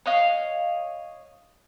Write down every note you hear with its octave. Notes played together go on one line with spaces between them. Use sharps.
C#5 D#5 F5